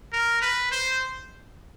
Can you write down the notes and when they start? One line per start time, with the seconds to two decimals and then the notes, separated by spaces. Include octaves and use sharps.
0.13 A#4
0.42 B4
0.72 C5